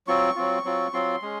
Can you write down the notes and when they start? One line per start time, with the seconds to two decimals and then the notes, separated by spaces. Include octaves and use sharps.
0.07 F#3 C4 F4 C#6
0.35 F#3 C4 F4
0.64 F#3 C4 F4
0.93 F#3 C4 F4 C6
1.22 G#3 C#4